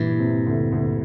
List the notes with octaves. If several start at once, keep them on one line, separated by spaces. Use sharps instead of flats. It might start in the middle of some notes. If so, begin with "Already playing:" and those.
Already playing: G2 A#2 E3
C3
D2
D2